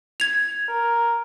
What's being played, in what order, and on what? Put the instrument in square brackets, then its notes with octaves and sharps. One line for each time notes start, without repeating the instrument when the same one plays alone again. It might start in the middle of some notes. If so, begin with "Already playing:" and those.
[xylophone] G#6 F7
[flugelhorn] A#4